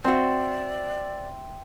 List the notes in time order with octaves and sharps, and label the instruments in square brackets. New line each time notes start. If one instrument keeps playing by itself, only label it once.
[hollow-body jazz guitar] C4 F#4 [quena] D5 [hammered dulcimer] E5 G5 C6